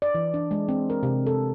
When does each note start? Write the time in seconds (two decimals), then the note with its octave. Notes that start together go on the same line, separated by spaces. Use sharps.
0.02 D5
0.15 E3
0.34 D4
0.51 G#3
0.68 C4
0.90 A#4
1.03 C3
1.26 A4